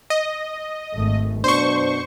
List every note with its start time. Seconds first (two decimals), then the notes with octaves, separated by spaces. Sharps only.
0.10 D#5
0.93 G#1 A3
1.44 F#2 B2 D4 C5 C#6